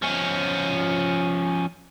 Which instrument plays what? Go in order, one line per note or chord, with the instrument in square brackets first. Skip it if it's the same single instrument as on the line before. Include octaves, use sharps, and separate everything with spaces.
[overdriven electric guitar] F3 C#4